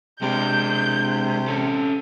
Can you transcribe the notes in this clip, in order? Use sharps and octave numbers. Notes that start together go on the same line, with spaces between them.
C3 G#3 D4 G6
C#4 A4